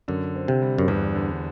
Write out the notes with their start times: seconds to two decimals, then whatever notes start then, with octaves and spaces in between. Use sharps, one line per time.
0.08 F#2 D3
0.36 C4
0.48 C3
0.62 G3
0.78 F#2
0.88 E2 G2
1.15 D3